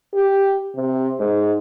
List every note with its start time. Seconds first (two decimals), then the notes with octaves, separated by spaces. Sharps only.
0.14 G4
0.76 C3
1.20 G#2